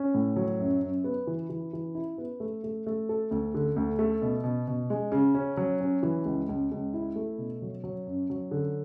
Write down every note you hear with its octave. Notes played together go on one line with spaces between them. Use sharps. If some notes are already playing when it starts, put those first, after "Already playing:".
Already playing: C#4
A2
F#3
F#2
F#2
B3
E3
E3
E3
E4
B3
A3
A3
A3
A4
D2
D3
D2
A3
B2
B2
B2
G#3
C#3
C#4
F#3
C#4
E3
C#2
C#2
C#2
E4
A3
B2
F#3
F#3
F#2
F#3
D3